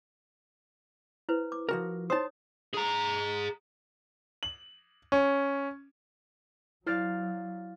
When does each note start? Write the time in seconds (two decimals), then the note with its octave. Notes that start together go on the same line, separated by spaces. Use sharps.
1.29 E4 B4 C5
1.52 D6
1.69 F3 F#4 A#4
2.10 D#4 C5 C#5 A5 D#6
2.74 G#4 A#5
4.43 F#7
5.12 C#4
6.87 F#3 E4 C5 D5 F5 F6 A6